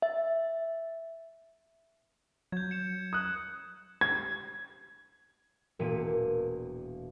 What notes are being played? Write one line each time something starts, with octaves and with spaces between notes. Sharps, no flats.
E5
F#3 G6 G#6
C#7 E7
D#6 F#6
G#6
E1 A#2 A#3 D#7